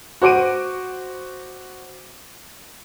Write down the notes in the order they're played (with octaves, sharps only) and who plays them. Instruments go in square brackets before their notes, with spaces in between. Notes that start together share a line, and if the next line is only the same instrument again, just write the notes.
[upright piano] F#4 C5 D6 D7 D#7